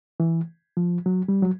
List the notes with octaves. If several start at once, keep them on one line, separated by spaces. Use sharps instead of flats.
E3
F3
F#3
G3
F#3